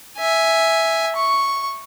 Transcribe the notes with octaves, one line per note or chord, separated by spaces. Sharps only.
E5 G#5
C#6